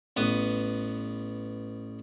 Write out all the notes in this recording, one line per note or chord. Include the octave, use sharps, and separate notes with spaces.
A1 B3 D#6